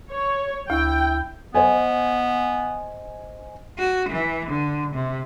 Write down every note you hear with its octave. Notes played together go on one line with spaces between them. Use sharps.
C#5
D2 E4 G5
B3 C5 D#5 G#5
F#4
E3
D3
C3